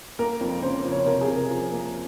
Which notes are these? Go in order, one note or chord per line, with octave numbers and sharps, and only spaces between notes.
A#3 A#4
F2
C#3 C5
F3
C#5
C3 A#4
G#4
C3
A#4
F3
A#3